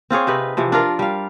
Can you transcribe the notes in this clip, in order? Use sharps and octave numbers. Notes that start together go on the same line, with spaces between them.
C4 F4 G#4 C#5
C3 D#4 B4
C3 E3 F3
D4 F4 A#4
G3 F5